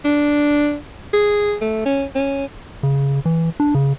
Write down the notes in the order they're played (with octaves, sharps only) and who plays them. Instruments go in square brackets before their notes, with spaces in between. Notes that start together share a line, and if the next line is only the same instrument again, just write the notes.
[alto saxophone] D4
G#4
A3
C#4
C#4
[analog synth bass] C#3
E3
D4
C#3